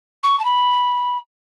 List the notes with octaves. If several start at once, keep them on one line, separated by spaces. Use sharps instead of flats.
C#6
A5
B5